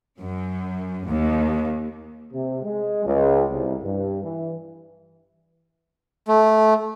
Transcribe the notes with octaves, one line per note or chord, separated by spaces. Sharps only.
F#2
D#2
C3
G#3
C#2
C2
G2
E3
A3